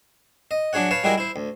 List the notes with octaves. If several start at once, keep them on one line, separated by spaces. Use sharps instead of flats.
D#5
F#3 D4 G#4 C#5 F#5
B4 C#5 F5 A5
G3 G#3 E4 F#4 G#4 A#4
E4 C5
D2